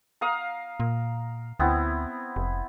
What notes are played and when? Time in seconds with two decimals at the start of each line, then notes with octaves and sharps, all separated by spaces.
0.21 A#4 F5 D#6
0.80 A#2
1.59 D2 B3 C4 E4
2.36 F1